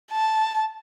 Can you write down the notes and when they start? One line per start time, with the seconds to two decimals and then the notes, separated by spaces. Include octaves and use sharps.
0.13 A5